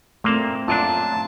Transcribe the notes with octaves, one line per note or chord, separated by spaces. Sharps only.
A#2 A3 A#3 C4 A5
F#2 A#2 D4 F4 A5